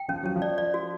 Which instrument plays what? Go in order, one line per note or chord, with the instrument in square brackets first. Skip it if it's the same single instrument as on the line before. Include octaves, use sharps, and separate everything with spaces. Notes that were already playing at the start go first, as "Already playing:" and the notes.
Already playing: [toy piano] G5
[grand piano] F3 [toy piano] C#4
[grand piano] F#3 [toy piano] C#4
[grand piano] F3
[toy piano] D5
D5
F#4